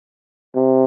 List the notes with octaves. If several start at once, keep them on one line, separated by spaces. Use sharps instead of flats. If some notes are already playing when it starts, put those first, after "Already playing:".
C3